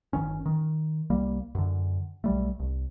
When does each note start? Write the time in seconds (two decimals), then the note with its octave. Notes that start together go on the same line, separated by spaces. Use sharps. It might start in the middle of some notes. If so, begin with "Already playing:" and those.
0.13 G1 D#3 C#4
0.46 D#3
1.10 C2 G3 A#3
1.55 F#2 D3
2.24 B1 G3 A3
2.59 C2